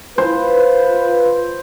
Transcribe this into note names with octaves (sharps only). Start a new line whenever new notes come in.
F4 B4 C5